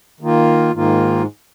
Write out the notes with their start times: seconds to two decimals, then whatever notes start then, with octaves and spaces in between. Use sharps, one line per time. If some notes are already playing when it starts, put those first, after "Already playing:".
0.21 D#3 A#3 F4
0.74 G#2 D#3 A#3 F4